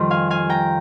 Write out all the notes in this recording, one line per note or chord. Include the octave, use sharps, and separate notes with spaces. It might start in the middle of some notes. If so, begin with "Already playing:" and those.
Already playing: F2 D#3 G3 C6
F5 G#5
F5 G#5
G5 A#5